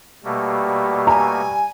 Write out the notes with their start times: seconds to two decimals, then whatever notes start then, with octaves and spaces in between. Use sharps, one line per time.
0.24 B2 G3 A3 A#3
1.07 G#5 A#5